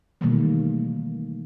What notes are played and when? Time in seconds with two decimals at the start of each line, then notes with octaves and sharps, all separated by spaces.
0.21 B2 D#3 E3 G3 A3 A#3